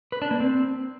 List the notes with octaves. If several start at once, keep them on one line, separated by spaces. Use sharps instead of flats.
B4
D4
A#3
C4